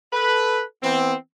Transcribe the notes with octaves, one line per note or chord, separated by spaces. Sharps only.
A4 B4
E3 B3 C4